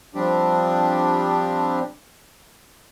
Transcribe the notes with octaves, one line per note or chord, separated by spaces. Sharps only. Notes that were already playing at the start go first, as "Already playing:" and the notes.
F3 G3 C4 D4 G4